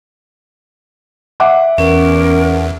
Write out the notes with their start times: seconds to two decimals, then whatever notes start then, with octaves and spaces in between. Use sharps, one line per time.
1.40 E5 F#5 D6
1.78 E2 C#4 A#4